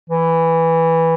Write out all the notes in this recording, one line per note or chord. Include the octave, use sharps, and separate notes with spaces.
E3